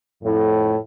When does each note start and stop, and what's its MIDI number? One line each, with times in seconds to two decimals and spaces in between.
0.23 0.76 41
0.23 0.76 45